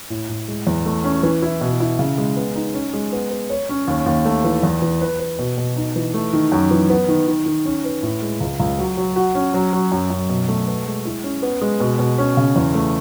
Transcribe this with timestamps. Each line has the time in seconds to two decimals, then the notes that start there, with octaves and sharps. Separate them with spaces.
0.10 A2
0.29 A2
0.48 G#3
0.67 E2
0.86 A3
1.04 C#4
1.23 E3
1.42 E4
1.61 B2
1.80 E4
1.99 C#3
2.18 G#3
2.36 B3
2.56 D#4
2.74 C#4
2.93 G#3
3.12 B3
3.31 B3
3.50 C#5
3.69 C#4
3.88 D#2
4.06 D#2
4.25 A3
4.44 E3
4.63 E2
4.82 E3
5.01 B4
5.19 B4
5.39 B2
5.58 B2
5.76 D#4
5.96 E3
6.14 A3
6.33 D#3
6.52 F#2
6.71 E3
6.90 B3
7.08 D#3
7.27 D#3
7.46 D#3
7.65 C#4
7.84 B4
8.03 A2
8.22 G#3
8.40 C#2
8.60 C#2
8.79 F#3
8.97 F#3
9.16 F#4
9.35 C#4
9.54 F#3
9.73 F#3
9.92 F#2
10.10 F#2
10.29 B2
10.48 A3
10.67 B3
10.86 G#3
11.05 E4
11.24 C#4
11.42 B3
11.61 G#3
11.80 B2
11.99 B2
12.18 C#4
12.37 C#3
12.56 E2
12.75 A3